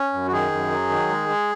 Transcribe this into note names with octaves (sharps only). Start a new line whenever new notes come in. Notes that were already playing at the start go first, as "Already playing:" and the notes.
Already playing: C#4
F#2
F#4
D#3 G#4
F#2
F#3
D#3
G#3
G#3